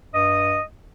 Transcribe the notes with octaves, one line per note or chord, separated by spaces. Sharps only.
G2 D#5 D#6